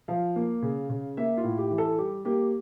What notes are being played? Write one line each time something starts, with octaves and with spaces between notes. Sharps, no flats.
F3 F5
A#3
C#3
C#3
A#3 E5
F4
A2
G4
E3
A4
G3 G4
A#3 G4